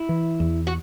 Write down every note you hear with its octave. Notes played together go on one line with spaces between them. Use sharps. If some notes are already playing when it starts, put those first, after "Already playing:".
Already playing: E4
E3
E2
F#4